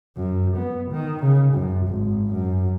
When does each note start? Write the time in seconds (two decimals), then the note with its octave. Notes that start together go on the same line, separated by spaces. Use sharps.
0.17 F#2
0.57 B3
0.92 D#3
1.24 C#3
1.54 F#2
1.87 G#1
2.32 F#2